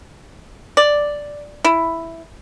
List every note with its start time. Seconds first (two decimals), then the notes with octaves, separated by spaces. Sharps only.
0.77 D5
1.64 E4